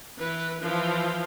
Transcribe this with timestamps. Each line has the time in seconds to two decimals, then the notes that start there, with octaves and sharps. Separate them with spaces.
0.18 E3 B4
0.60 E3 F3